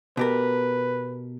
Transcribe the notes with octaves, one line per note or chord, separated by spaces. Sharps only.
B2 G4 A#4 B4